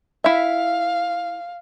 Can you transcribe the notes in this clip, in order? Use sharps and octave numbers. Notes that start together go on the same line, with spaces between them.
E4 E5 F5